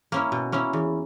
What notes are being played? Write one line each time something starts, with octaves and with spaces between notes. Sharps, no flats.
A#3 C#4 E4
B2
A#3 C#4 E4
E2